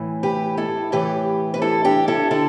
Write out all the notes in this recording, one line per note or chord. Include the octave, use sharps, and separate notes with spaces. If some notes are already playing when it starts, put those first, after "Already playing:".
Already playing: A2 E3
G4 B4
E4 A4
A2 E3 G4 B4
B4
E4 A4
D4 G4
E4 A4
D3 E4 A4